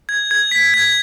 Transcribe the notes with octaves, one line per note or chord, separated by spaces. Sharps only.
G#6
G#6
B6
G#6